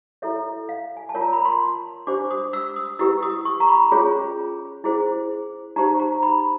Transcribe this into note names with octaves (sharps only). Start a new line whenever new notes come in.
E4 A4 C#5 E5
F5
G#5
A5
F4 A#4 C#5
A#5
B5
C6
D4 G4 C5 D6
D#6
E6
D#6
E4 G4 B4 E6
D#6
C#6
A#5
B5
C#4 F4 G#4 C#5
E4 G#4 C5
D#4 G4 C5 A#5
A#5
B5